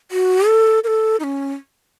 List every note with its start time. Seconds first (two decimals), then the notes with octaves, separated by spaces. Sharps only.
0.11 F#4
0.47 A4
0.84 A#4
0.87 A4
1.20 D#4
1.24 C#4